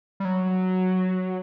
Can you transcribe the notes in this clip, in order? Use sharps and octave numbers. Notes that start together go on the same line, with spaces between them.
G3
F#3